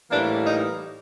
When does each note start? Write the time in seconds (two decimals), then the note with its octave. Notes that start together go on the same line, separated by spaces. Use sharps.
0.10 A2 E3 G3 A#3 D4
0.45 D#4